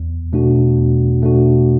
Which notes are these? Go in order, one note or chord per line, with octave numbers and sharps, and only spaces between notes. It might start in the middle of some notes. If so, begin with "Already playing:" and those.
Already playing: E2
B2 A3 D4 F#4
E2
B2 A3 D4 F#4